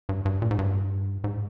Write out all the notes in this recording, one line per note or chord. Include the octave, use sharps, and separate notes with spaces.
G2
G2
A#2
G#2
G2
G#2